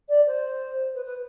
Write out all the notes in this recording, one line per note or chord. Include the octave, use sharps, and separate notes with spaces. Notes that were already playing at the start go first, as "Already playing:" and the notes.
D5
C5
B4
B4